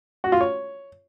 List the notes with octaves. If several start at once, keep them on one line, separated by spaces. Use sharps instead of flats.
F#4
F4
C#5